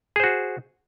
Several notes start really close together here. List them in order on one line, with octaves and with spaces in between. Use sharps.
G#4 C5 F#4